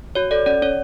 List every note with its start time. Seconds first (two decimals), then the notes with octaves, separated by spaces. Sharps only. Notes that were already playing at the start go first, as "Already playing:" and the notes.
0.15 F#4 C#5
0.31 A4 D5
0.46 C#4 D5
0.62 C#4 C#5